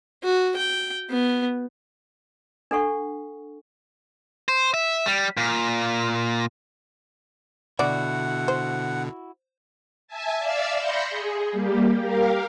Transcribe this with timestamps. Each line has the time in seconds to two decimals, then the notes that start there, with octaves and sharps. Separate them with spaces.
0.23 F#4
0.57 G5
1.10 B3
2.71 D4 A4 F#5 C#6
4.48 C5
4.74 E5
5.06 G3
5.37 A#2
7.79 B2 D3 E4 F#4 D5 F#5
8.48 C5
10.08 E5 G#5 A5
10.39 D5 E5 F5 E6
10.78 B5 C6 G6 A#6 C#7
11.10 G#4
11.52 G3 A#3 G4
11.97 G4 A#4 F5